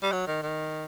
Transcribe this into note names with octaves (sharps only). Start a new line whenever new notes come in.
G3
F#3
D#3
D#3